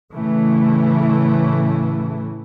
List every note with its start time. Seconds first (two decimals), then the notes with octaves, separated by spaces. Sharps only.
0.13 A2 C#3 E3 A3